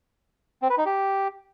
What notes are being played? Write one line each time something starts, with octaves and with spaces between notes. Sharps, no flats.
C4
B4
D#4
G4